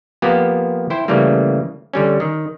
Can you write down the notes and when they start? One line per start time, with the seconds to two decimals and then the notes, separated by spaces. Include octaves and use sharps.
0.22 F3 A#3 B3 G4
0.90 E4 C5 G5
1.08 C#3 E3 G3 A3 A#3
1.93 D3 G3 C#4
2.20 D#3